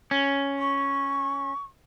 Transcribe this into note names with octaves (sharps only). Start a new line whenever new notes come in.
C#4
C#6